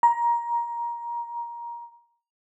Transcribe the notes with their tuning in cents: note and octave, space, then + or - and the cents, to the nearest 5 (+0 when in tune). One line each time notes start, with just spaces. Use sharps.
A#5 +20